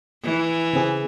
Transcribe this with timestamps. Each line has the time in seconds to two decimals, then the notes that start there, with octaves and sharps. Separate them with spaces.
0.23 E3
0.73 C#3 C4 G#4